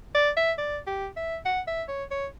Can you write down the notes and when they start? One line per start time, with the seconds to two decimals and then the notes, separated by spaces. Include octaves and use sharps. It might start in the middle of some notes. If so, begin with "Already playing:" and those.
0.15 D5
0.37 E5
0.58 D5
0.87 G4
1.17 E5
1.46 F#5
1.68 E5
1.89 C#5
2.11 C#5